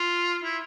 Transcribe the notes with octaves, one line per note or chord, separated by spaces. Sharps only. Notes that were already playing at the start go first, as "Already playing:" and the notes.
Already playing: F4
E4